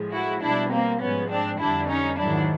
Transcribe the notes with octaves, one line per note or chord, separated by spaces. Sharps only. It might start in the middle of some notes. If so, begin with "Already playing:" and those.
Already playing: A2 F3 G#3
E4 F#4
B2 G3 D4 E4
A#3 C4
G#2 F3 G#3 B3 C#4
C4 D4
F2 D3 G3 D4 E4
C#4 D#4
G#2 D#3 F#3 D4 E4